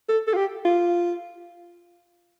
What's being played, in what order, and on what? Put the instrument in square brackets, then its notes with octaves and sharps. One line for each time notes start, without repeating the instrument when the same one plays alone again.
[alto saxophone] A4
A4
F4
G4
F4